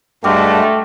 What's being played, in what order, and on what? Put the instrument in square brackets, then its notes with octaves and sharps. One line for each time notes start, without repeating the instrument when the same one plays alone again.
[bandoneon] G2 [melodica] G#3 F#4 [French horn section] A3 [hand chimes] G5 D6 F6